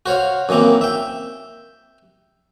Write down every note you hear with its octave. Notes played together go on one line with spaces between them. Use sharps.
F#4 C5 C#5 F5
F#2 D#3 E3 A#3 C4
E5 G5